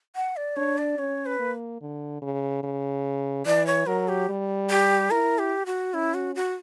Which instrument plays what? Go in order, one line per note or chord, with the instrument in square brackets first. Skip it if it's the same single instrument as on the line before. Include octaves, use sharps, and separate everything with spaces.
[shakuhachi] F#5
D5
[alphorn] D4 [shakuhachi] C#5
[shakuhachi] D5
[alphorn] C#4 [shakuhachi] C#5
[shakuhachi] B4
[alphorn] A#3
D3
C#3
C#3
[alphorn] E3 [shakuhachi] D5
[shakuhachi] C#5
[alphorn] F#3 [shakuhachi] A#4
[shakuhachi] G4
[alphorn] G3
[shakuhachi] G4
[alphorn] E4 [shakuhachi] A#4
[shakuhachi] G4
F#4
[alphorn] C#4 [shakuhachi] E4
[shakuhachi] F#4
F#4